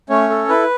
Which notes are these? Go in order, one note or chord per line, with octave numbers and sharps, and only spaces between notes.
A3 C#4 C#5
A4
E4 B4